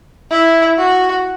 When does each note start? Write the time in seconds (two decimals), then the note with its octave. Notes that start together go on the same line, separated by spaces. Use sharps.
0.31 E4
0.78 F#4